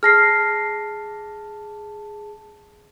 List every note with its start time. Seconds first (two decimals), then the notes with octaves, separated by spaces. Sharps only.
0.03 G#4 A5 F6 A#6 C7